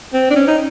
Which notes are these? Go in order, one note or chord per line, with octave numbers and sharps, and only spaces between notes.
C4
D4
C#4
D#4